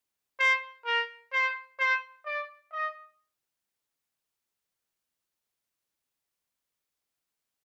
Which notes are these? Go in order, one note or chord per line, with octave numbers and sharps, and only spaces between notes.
C5
A#4
C5
C5
D5
D#5